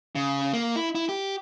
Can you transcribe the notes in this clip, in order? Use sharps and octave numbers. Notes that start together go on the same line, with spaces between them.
C#3
A#3
E4
E4
G4